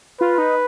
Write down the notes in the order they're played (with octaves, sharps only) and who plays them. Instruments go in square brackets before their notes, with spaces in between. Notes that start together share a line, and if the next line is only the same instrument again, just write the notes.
[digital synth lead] F4 [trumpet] B4
[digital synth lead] D#4